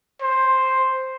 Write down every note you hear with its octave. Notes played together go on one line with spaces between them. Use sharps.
C5